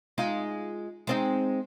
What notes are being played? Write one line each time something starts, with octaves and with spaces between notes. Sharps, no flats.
G#3 D#4 F4
G#3 C4 D#4